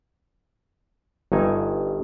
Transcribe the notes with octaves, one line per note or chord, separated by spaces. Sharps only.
G1 G2 D#4 G#5